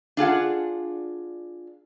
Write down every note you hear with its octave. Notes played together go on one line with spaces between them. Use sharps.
D4 F4 G#4 F#5